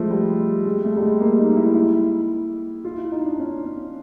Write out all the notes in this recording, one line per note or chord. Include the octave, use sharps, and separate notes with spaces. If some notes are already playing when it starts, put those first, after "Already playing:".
Already playing: F3 G#3 A3
G3
G#3
A3
G3
G#3
A#3
D#4
E4
E4
F4
E4
D#4
D4
C#4
C#4